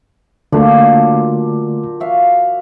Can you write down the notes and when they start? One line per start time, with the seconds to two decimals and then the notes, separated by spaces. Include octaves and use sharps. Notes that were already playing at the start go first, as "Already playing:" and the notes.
0.52 A#2 D3 F#3 A3 A#3 D4
2.00 F#4 E5 F5